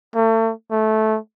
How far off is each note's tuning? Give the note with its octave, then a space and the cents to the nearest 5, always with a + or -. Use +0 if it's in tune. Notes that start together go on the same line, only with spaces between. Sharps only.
A3 +35
A3 -15